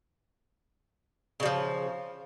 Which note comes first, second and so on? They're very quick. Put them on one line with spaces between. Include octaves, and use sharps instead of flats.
C#3 G3 F3